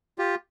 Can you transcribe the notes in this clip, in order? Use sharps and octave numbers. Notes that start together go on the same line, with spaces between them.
F4 G4